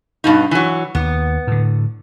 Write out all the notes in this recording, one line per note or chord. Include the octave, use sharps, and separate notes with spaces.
G2 B2 D#4
E3 F#3
D#2 B3
A2 D3